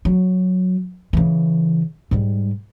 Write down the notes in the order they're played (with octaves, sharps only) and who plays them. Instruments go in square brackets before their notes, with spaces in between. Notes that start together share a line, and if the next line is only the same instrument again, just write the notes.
[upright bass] F#3
C#3 E3
G#2 G3